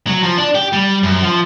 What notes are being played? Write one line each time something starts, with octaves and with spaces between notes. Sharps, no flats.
F#3
F3
D4
G4
G3
F#2
F3